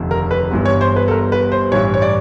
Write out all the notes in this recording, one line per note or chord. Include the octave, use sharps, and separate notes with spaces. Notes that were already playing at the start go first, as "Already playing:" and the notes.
Already playing: F1 D#2 D3 F3
A#4
B4
G1 G2 E3
C#5
C5
B4
A4
A#4
B4
C5
A1 G2 E3 C#5
C#5
D5